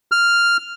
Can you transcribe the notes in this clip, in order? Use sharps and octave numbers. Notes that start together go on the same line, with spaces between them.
F6